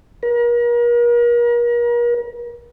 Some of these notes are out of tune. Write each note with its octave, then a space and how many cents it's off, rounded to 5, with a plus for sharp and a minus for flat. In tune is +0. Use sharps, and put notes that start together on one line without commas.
A#4 +40